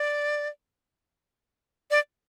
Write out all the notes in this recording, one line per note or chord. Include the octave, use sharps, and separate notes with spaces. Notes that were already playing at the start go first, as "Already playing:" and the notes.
Already playing: D5
D5